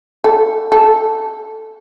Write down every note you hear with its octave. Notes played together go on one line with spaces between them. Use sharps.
A4
A4